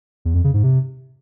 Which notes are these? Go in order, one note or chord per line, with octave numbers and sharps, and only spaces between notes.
E2
F2
C#3
G#2
C3